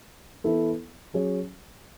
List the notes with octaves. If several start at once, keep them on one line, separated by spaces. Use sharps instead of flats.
E3 B3 E4 A4
F#3 C#4 G#4 C#5